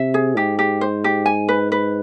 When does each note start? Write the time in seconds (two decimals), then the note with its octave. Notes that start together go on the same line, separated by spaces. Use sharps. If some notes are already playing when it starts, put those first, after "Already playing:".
Already playing: C3 E5
0.14 G#4
0.36 G#2 G4
0.59 G4
0.81 C5
1.04 G4
1.26 G#5
1.49 B4
1.72 B4